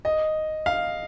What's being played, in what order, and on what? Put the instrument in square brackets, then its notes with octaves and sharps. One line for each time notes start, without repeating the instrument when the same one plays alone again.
[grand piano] D#5
F5